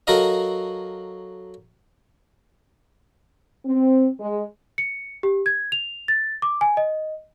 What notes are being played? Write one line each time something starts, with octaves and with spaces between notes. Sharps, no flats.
F#3 F#4 A4 A#4 D#5 F5
C4
G#3
C#7
G4
G#6
F7
A6
D6
G#5
D#5